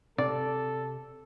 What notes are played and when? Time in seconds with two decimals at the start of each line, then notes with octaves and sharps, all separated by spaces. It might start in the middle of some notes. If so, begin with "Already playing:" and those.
0.18 C3 A4 D5